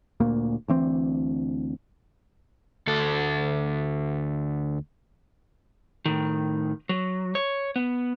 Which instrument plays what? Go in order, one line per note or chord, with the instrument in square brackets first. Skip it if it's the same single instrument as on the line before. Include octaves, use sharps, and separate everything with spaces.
[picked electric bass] D2 A#2 A#3
D2 E3 C4
[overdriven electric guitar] D2 A4
[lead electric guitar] A2 D#3
F#3
C#5
B3